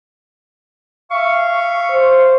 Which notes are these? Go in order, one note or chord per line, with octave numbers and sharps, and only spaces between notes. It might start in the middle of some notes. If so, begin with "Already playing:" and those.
E5 F5 C#6
C5